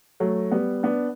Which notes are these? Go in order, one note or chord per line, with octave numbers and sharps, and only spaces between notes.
F#3 A3
G3 B3
B3 D4